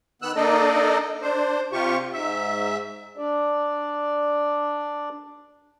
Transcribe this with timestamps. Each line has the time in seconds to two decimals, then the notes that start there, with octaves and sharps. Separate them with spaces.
0.22 D#3 B3 E6 F#6
0.36 A#3 D4 D#4 A4 D5 D#5
1.22 D4 C5
1.72 C3 F4 G4 C#6
2.13 G#2 E5
3.17 D4 D5